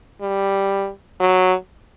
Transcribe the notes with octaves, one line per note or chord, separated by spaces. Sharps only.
G3
F#3